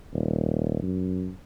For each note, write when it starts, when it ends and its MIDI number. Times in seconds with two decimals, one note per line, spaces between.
0.13 0.80 27
0.82 1.30 42